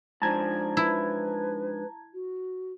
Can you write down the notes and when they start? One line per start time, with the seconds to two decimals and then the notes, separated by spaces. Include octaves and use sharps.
0.22 G#2 F3 D4 A5 A#5 G#6
0.77 E4 B4
2.14 F#4